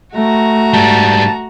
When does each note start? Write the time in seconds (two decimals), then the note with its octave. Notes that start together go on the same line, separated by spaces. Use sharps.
0.14 A3 F#4 A#5
0.74 G#2 G3 A5